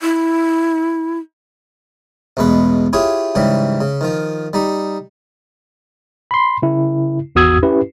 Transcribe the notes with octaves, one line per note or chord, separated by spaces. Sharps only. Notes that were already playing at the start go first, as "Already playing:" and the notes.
E4
A1 E2 B2 G#3 B4
E4 F4 G4 G#4 C#5
G#2 C#3 E3 G3 G4
C#3
D#3 F3 F4
G3 D#4 G4
B5 C6
C#3 E4
G#1 E2 F#4 D#6 E6 G#6
C#4 E4 G4 B4